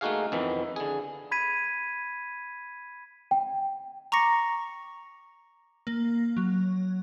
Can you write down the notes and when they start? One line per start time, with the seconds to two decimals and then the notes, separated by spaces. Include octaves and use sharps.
0.01 A3 A#3 D#4 F#4 G#4 F5
0.32 F2 D#3 E3 B3
0.76 D3 G#4
1.31 B5 G#6 B6 D#7
3.31 G5
4.12 A#5 C#6 D6 A#6 C#7
5.87 A#3
6.37 F#3